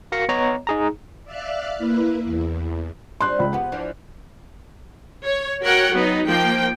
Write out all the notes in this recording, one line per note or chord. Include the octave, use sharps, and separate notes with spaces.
F#4 A#4 F5 A#6 C#7
B3 C#5 D#5 A#5
D#4 G#4 A#5
D5 E5 F5 F6 F#6
A#3 E4 B4
E2
G3 C4 D4 C6 F#6
C#2 B5
C3 B3 F#5
E3 F3 D4
C#5
F#4 A#4 C#5 F#5 G5
F#3 B3 D#4
F3 A#3 G5